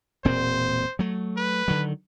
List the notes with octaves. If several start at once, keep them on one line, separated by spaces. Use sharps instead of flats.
E1 A#2 C4 C5
F#3 A3
B4
D3 D#3 F#3